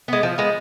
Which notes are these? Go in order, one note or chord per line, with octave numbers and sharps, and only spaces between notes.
G#3 B3
F3
G#3 B3